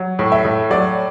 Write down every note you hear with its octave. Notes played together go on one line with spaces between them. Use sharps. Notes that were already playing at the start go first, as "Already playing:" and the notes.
Already playing: F#3
A2
E5
A2
F#3 D5